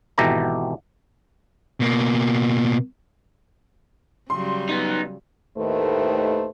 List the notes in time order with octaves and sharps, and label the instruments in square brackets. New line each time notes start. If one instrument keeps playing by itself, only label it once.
[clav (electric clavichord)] G#1 B2 E3 G4 A4 A#5
[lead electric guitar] B2 A#3
[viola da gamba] C#3 F#3 G3 [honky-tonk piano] C6
[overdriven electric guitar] B3 D#4
[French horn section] D#2 A2 D#3 A3 B4 C5